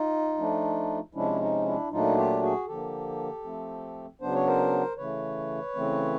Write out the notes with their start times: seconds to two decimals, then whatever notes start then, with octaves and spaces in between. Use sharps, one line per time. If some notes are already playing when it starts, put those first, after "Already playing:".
Already playing: D#4 F4
0.38 F3 A3 D4
1.15 C3 F3 G#3 C#4 D4 E4
1.41 D#4
1.66 D4 E4
1.91 A#2 F#3 A3 D4 D#4 F4
2.17 F4 G4
2.42 F#4 G#4
2.68 D3 F3 A#3 G4 A4
3.44 F3 A3 C4
4.21 C#3 F#3 B3 D4 C5
4.35 C#5
4.47 A#4 C5
4.97 C#3 E3 A3 B4 C#5
5.75 C#3 E3 A3 C4